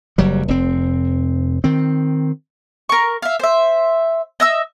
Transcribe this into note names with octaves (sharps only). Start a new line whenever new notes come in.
F#1 F#3 G3
F1 C4
D#3 C4
A#4 C#6
E5 F5
C5 E5
D#5 E5 E6